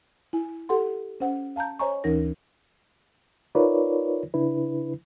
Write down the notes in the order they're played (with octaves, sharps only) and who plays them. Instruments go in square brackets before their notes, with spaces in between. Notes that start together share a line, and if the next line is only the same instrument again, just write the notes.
[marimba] E4 G#5
G4 A4 F#5 C6
C#4 C5 F#5
F5 A5 A#5 G6
C5 C#5 D#5 G#5 A#5 C#6
D2 E3 C#4 D#4 A#4 A#6
[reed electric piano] D#4 F4 A#4 B4 C#5 D5
C#3 D4 E4 B4